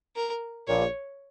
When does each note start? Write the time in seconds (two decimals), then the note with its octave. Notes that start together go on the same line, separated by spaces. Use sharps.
0.16 A#4
0.68 A#1 A#2 C#5